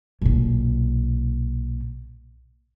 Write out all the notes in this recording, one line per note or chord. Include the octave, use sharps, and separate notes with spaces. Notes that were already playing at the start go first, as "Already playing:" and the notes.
B1 A#2